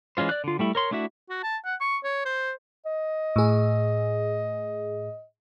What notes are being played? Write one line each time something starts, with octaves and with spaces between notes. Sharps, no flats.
E3 G#3 C#4 F4 C5
D5 F#6
D3 F4
G3 A3 E4
A#4 C#5 C6
A3 D4 E4 F#4 E5
F#4
A5
F#5
C#6
C#5
C5
D#5
A2 G#4